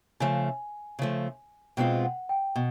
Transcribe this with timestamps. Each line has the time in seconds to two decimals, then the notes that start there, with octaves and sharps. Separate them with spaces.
0.20 C#3 F3 A3 G#5
0.99 C#3 F3 A3
1.77 B2 G#3 C4 F4 G5
2.03 F#5
2.29 G5
2.56 B2